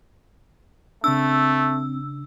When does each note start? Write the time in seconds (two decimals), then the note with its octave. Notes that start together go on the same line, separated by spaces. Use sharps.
1.04 C#3 A3 C4 D4 E6